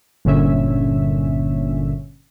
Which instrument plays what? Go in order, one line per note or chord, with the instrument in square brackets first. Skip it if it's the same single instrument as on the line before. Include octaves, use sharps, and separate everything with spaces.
[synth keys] G1 A#2 D3 C#4 E5